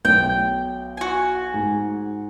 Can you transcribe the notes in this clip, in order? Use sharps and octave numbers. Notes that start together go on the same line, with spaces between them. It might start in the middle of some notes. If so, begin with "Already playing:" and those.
B1 G5
F#4 G#5
G#2